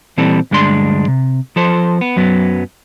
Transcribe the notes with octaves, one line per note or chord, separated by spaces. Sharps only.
A#2 E3 G3 C4 A4
D2 G2 G#3 D4 D5 C6
C3
F3 A4 C5
B3
F#2 F#3 B3